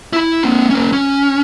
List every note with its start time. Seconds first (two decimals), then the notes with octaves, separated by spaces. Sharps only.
0.13 E4 B5
0.44 A#3 C4
0.70 A#3 C#4
0.92 C#4